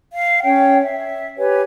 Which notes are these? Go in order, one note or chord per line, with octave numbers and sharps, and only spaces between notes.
F5
C#4 C#5 G5
E5
G4 B4 C#5 G#5